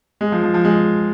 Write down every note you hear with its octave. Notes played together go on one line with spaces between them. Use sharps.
G#3
F3
F3
F3
G#3